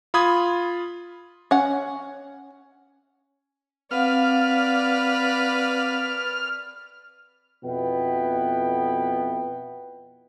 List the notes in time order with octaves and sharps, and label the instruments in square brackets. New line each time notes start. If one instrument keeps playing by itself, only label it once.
[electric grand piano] F4 B5 D#6 G#6
[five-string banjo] C#4 F#5
[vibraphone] C4 F5 F#5 [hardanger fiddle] B4 D5 [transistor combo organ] F6
[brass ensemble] F2 B2 B3 E4 B4 G5